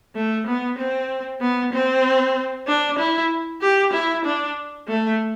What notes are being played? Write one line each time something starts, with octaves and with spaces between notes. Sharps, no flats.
A3
B3
C4
B3
C4
D4
E4
G4
E4
D4
A3